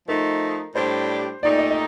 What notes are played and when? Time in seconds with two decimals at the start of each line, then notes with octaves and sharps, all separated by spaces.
0.08 F3 A3 D#4 A#4
0.75 A2 G3 D4 G4 C5
1.42 A#2 A3 D#4 G4 D5
1.59 D#5
1.70 D#5